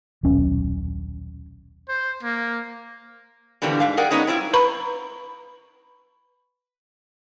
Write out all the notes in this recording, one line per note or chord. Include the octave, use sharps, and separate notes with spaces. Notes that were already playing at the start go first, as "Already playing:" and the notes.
D#1 B1 C#4
C5
A#3
B2 D3 E3 G3 A#3 C4
G#2 E5 F5
G#4 A#4 D5 F#5 G5
G#3 A#3 B3 C#4 D#4
G3 C4 E4 F4
B4 A#5 B5 C#6